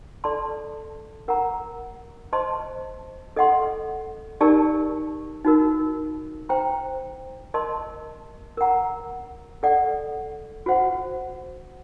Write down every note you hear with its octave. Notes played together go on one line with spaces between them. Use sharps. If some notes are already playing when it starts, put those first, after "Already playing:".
A4 D5 A5 C6
A#4 F#5 A#5
C5 D#5 A5 C6
A4 D#5 F#5 C6
D#4 G4 A#4 D5 A5
D#4 F#4 A#4
C5 G5 A#5
A#4 D#5 A5 C6
A#4 F#5 A#5
A4 D5 F#5
F#4 C5 F#5